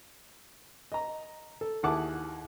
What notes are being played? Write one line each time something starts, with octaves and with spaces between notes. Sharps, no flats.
D#5 A#5
A4
D#2 E4 G#4 F#5 A5 D6